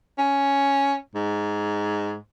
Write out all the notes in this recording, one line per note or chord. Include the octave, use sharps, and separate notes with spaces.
C#4
G#2